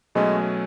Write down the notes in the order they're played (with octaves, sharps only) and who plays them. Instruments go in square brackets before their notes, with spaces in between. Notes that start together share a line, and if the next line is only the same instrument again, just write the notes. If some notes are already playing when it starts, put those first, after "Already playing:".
[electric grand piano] B2 F#3 A3 C#4 [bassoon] G#3